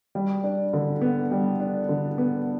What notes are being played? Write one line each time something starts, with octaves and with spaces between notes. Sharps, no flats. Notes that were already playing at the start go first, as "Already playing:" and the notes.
G3
D4
D3
B3
G3
D4
D3
B3